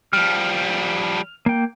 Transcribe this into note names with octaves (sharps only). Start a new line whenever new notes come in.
F3 G3 F6
A#3 G5